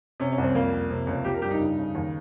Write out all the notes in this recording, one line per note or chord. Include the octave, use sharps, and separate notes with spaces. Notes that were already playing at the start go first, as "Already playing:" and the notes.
C3 C#4
C#4
C2
C4
F2 A#3
F2
C3
C#2
F3 G4
A#4
G2 G4
D#4
C#3
C#3
D#2